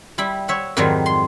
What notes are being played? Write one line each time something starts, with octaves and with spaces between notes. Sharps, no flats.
G3 E4 B5
C#5 E5 F#5
F2 G#2 D#3 F#3 G3
C6